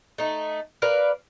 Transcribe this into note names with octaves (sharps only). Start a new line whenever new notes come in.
A3 D#4
A#4 B4 D5 F5